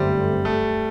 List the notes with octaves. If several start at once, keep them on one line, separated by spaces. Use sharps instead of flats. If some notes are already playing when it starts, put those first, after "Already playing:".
Already playing: G1 F#2 D3 G3 A3 C4
A3